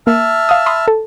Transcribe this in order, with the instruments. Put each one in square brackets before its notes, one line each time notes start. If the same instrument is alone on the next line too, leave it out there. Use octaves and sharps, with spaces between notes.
[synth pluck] A#3 [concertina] E5 A5 F6
[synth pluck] F5 D#6
B5 C6 D#6
A4